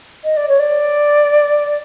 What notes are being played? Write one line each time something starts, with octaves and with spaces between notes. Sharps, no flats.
D#5
D5
C#5
D5